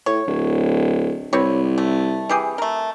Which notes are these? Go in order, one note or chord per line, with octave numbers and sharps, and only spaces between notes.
A2 C#5
D1
C2 C4 B4 C#5
A3
E3 G4 G#4
A3 A#4